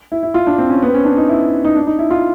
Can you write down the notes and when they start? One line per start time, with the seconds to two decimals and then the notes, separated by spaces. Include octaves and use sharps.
0.12 E4
0.23 E4
0.34 F4
0.47 D4
0.58 C4
0.70 C#4
0.82 B3
0.88 C4
0.94 C#4
1.05 D4
1.18 D#4
1.29 E4
1.65 D#4
1.76 D4
1.87 D#4
1.99 E4
2.11 F4